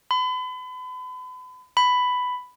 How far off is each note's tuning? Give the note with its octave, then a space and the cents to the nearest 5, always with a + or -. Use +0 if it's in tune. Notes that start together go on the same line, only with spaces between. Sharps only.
B5 +40
B5 +10